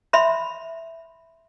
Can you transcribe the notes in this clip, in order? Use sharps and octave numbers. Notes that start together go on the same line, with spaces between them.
E5 B5 C6